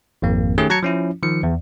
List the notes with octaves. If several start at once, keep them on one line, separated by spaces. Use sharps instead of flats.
G#1 F2 A#3
D#3 A3 C#4 G4 G#4
F#3 A5 A#5 G#6 C#7
F3 C#4 E4
D#3 F3 C#7
E2